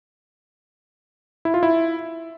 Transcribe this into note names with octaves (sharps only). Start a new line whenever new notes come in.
E4
F4
E4